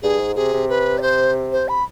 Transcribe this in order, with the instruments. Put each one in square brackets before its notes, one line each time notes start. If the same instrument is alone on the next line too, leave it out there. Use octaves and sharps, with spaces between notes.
[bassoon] G2 [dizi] G#4
[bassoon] G#2
[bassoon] C3 [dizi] G#4
[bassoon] C3
[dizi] B4
D5
C5
C5
B5